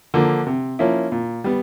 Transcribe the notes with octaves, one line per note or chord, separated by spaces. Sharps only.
D3 F3 A#3
C3
F3 A#3 C#4 E4
A#2
G3 B3